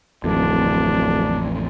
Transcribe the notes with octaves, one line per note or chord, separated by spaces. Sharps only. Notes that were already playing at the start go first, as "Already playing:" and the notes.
D1 A1 F2 D4